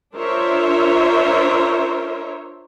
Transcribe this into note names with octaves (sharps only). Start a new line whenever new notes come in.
D4 F4 A#4 C5 C#5 E5